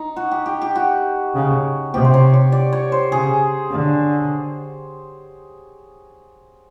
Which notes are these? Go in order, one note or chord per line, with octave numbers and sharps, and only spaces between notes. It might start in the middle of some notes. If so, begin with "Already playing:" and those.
Already playing: D#4
F#4
G4
G4
G4
F#4
C#3
C3 G4
C5
C#5
C#5
D5
C#5
C5
C#3 G#4
D3